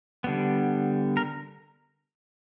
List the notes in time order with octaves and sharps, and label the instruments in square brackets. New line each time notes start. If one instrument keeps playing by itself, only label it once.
[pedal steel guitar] D3 G3 B3
A#4